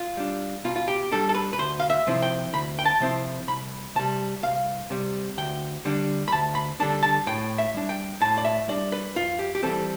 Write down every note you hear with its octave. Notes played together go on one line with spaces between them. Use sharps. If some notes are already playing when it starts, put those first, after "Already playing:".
Already playing: F4
G3 D4
B2 F4
F4
G4
G3 D4 A4
A4
B4
B4
D2 C5
F5
E5
C3 F3 C4 E4
G5
D2 B5
G5
A5
C3 F3 C4 E4
C2 B5
C3 G3 A5
C2 F5
C3 G3
D2 G5
D3 G3 D4
B5
D2 A5
B5
D3 G3 D4 A5
A5
A2 G5
E5
G3 D4
G5
A2 A5
D5
E5
G3 D4 D5
B4
F2 F4
G4
G4
E3 G3 C4 A4